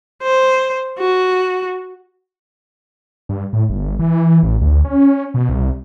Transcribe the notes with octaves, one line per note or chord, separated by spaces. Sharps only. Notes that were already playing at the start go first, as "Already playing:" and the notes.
C5
F#4
G2
A2
G1
E3
A1
D2
C#4
B2
C2